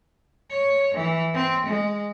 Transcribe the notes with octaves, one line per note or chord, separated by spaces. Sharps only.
C#5
E3
C4
G#3